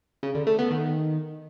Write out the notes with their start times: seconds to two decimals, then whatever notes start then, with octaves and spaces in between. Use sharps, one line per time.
0.23 C#3
0.35 D3
0.47 A3
0.59 B3
0.71 D#3